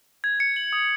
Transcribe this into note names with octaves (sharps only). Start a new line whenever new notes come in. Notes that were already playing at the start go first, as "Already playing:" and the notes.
G#6
C#7
F#7
D#6